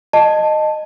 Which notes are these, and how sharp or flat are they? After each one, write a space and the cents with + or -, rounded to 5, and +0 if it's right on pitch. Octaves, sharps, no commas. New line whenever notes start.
D#5 -15 A5 +0